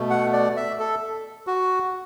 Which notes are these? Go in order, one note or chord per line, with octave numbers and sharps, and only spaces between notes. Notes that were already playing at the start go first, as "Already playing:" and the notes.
Already playing: B2 A3
F#5
D5
E5
A4
F#4